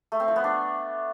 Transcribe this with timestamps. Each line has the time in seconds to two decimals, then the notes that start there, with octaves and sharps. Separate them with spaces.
0.12 A3
0.20 C4
0.28 F3
0.36 B3
0.44 D4